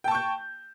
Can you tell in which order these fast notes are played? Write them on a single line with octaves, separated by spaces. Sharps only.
G5 A5 C#6 G6